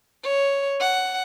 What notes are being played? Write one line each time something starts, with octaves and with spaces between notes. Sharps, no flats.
C#5
F#5